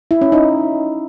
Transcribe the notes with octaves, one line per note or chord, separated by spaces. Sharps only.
E4
C#4
D#4